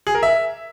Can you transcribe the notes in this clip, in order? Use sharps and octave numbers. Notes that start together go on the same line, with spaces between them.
G#4
A#4
E5